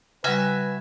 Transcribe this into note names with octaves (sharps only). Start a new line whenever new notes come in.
C#3 G3 F#4 B4 E5 G#5